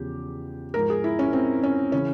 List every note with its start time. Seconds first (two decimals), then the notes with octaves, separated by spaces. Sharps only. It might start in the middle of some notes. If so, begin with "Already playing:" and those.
Already playing: E2 C#3 F3 G4
0.74 G#2 F3 A#4
0.90 G#4
1.04 E4
1.19 C#4
1.33 C4
1.64 C#4
1.92 C#3 E3 C#4